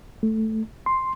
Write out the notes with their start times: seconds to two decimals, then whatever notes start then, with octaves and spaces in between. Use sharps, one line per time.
0.23 A3
0.86 C6